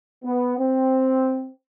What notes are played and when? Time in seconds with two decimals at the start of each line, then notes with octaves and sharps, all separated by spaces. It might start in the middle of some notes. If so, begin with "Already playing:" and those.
0.24 B3
0.58 C4